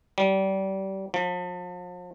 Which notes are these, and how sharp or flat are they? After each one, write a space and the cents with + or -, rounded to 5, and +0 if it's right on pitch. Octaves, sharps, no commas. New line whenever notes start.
G3 -30
F3 +40